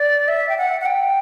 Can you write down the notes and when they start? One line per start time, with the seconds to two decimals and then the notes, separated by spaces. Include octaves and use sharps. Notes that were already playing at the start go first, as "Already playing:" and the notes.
Already playing: D5
0.28 E5
0.49 G5
0.58 F#5
0.81 F#5
0.86 G5